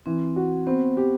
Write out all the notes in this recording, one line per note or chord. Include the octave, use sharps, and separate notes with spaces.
E3 C4
F#4
B3 C4
G4